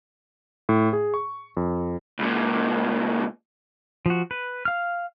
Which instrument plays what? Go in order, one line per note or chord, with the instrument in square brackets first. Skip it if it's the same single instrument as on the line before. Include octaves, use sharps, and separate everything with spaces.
[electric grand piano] A2
G#4
C#6
F2
[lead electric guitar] C#2 A#2
[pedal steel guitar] F3 F#4
B4
F5 F6